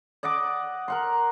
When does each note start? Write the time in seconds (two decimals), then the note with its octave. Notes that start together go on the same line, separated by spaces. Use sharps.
0.23 D5 D#5 F#5 D6
0.88 A#4 F#5 C6